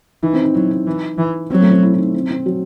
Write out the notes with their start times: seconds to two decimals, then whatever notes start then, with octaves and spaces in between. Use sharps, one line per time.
0.23 E3 D#4
0.33 C4
0.44 D#4
0.54 F#3 E4
0.71 D#4
0.87 E3
1.18 E3
1.50 F#3 C4
1.62 A3
1.71 C4
1.83 E4
1.94 E4
1.98 D#4
2.14 C4
2.31 C4
2.46 F#3